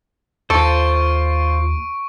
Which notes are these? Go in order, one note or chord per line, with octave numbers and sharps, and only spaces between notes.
D#2 F4 A4 C5 C#6 D7